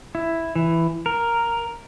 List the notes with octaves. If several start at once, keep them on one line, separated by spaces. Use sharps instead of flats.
E4
E3
A#4